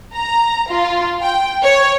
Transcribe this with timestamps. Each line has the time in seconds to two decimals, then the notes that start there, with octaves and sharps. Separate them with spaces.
0.14 A#5
0.71 F4
1.22 G5
1.64 C#5